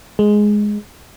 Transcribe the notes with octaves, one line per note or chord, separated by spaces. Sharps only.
G#3